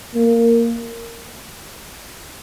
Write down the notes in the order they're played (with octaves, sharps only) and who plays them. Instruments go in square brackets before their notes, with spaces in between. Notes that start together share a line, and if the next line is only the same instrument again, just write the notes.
[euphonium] A#3